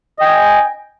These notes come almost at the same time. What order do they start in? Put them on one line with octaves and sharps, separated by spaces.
D#5 G5 G#5